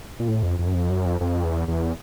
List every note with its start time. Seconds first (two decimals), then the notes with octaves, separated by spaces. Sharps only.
0.20 A#2
0.28 A2
0.43 F2
0.59 F2
0.67 F#2
0.74 F2
0.90 F#2
1.05 F2
1.21 F2
1.44 E2
1.68 E2